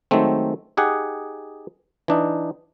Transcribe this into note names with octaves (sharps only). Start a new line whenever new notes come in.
D#3 F#3 G#3 A3 C4
D#4 G4 G#4 F#5
E3 D4 D#4